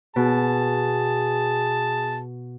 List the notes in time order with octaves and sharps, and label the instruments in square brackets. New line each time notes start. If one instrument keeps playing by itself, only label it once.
[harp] B2 [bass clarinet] G#4 [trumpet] A5